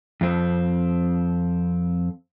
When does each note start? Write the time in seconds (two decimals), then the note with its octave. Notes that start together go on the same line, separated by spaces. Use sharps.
0.21 F2 C4